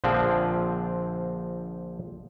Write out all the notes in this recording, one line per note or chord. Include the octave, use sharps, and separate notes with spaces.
A#1 D3 F3 C4 G#4